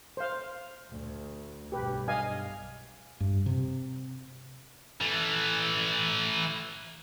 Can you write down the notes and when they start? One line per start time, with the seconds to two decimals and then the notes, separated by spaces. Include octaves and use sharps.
0.17 C5 F5
0.89 D2
1.72 B1 G2 G4 B4
2.08 D#5 F5 G#5
3.20 G2
3.46 C3
5.01 E3 A3